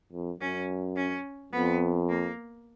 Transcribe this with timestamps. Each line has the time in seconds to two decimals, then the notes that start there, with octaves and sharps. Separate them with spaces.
0.13 F2
0.40 F#2 C#4
0.96 C#4
1.52 F2 B3
2.09 A#3